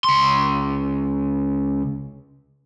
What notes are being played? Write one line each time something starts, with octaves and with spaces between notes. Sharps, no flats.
C#2 C6